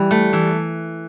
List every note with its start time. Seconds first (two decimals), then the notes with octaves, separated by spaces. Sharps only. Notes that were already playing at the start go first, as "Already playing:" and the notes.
Already playing: E3 G3
0.11 A3
0.33 E3